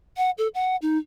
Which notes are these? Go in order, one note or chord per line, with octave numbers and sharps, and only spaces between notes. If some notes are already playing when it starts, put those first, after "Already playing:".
F#5
A4
F#5
D#4